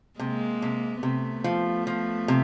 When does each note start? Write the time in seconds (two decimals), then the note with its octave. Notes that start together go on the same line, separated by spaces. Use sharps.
0.19 C3 G#3 A#3
0.62 C3
1.03 C3 A3 B3
1.44 F3
1.87 F3
2.28 C3